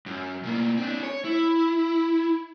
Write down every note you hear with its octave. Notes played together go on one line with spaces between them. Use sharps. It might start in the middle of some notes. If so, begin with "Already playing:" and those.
F#2
B2 A#3
C4 D4
C#5
E4